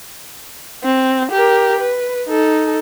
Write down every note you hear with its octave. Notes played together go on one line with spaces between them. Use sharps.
C4
G4 A#4
B4
D#4 A4